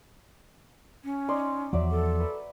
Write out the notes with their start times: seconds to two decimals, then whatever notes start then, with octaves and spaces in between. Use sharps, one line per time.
1.04 C#4
1.29 D#4 D5 C6
1.73 E2 F3 F#3 D5 E5
1.91 A4
2.20 B4